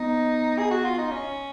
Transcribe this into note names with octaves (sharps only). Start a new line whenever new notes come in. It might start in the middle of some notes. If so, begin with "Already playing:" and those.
Already playing: B3 D#4
G#4
F#4
F4
D#4
C#4